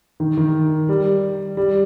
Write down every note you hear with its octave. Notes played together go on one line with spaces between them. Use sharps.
D#3
D#3
G3
G3